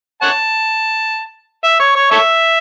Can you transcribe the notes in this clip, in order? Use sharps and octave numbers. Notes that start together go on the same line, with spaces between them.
C#5 F#5 A5
E5
C#5
C#5
A4 C#5 E5